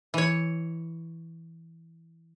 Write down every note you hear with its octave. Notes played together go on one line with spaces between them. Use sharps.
E3 C#5